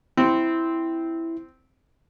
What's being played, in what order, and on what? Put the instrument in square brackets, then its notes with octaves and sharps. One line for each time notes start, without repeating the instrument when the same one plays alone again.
[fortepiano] C4 [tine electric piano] E4